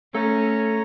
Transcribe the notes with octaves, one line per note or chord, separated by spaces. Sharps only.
A3 C#4 A4 C#5 A#5